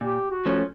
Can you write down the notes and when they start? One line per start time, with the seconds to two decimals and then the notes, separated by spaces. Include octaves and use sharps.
0.01 A#2 G4
0.30 F#4
0.46 F3 A3 C#4